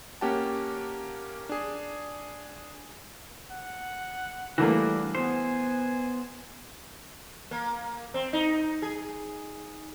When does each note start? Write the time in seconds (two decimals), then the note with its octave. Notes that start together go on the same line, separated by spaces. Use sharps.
0.21 A#3 C#4 G4 F#5 A5
1.49 D4 G#4
3.52 F#5
4.58 E3 G3 A3 A#3 D4 F#4
5.15 B3 C5 G#5
7.51 A#3
8.14 C4
8.33 D#4
8.82 G#4